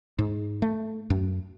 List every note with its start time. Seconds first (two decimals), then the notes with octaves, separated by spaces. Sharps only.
0.19 G#2
0.62 A3
1.10 F#2